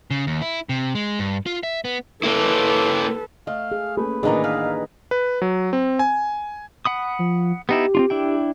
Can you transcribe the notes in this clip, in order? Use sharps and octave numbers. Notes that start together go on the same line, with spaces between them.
C#3
D#2
E4
C3
G#3
G2
F4
E5
B3
A#3 E4 A4 B4
A3 D#5 F5
G#4
A3 A#3 C#4 B4
A1 D#3 E3 A#3 D4 G#4 D#5 A#5
B4 F5
B4
F#3
C4
G#5
F#5 B5 D#6
F3
B3 D#4 E4 G4
C4 D4 F4
D4 E4 G5